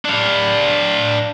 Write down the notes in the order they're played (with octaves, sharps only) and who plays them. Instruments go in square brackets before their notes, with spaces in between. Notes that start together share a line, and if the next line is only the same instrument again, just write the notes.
[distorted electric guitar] D4 F5